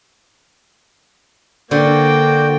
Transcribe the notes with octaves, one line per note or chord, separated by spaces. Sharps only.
D3 A#3 F#4 C5 D5 G5